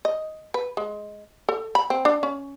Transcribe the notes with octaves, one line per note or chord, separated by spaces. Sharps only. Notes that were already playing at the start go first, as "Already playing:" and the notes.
D#5
B4
G#3
A4
B5
C4
D4
C#4